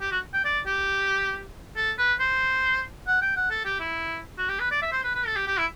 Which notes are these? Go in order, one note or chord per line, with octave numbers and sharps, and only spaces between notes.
G4
F#4
G5
D5
G4
A4
B4
C5
F#5
G5
F#5
A4
G4
E4
F#4
G4
B4
D5
E5
C5
B4
B4
A4
G4
G4
E4